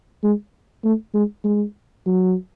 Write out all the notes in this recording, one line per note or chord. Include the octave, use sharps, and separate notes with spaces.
G#3
A3
G#3
G#3
F#3